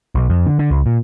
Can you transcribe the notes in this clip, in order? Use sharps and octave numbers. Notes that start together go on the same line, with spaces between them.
B1
F2
D3
D3
C#2
A#2